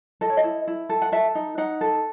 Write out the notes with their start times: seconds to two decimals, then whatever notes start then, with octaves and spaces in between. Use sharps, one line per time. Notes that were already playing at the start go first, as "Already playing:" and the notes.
0.21 A4 D#5
0.30 C#5
0.37 D#5
0.44 E4
0.67 E4
0.89 A4
1.02 F#5
1.12 A4 E5
1.35 D#4
1.58 D#4 F#5
1.81 A4